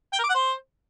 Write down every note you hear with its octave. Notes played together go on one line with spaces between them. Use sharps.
G5
A#4
D6
F#5
C5